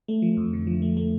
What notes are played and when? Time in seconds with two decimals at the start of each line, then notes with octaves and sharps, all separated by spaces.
0.08 A3
0.22 F3
0.37 F2
0.53 D3
0.67 F3
0.82 A3
0.97 A3